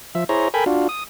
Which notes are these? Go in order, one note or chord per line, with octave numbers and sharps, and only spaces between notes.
F3 E5
E4 G#4 C5 C#5 A#5
A4 A#4 G5 G#5 B5
D4 F4 F#4
D#6